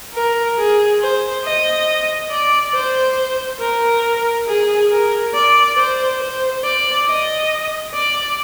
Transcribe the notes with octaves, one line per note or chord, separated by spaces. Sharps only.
A#4
G#4
C5
D#5
D5
C5
A#4
G#4
A#4
D5
C5
C5
D5
D#5
D5